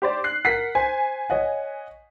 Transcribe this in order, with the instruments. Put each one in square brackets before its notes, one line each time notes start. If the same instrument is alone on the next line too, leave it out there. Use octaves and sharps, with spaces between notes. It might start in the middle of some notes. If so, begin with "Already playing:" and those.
[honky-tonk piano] G4 C5 D5
F#6 C7
[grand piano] A#4 B6 C7 [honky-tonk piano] F#5
[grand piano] C5 [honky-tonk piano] G#5
[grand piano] C#5 D#5 F#5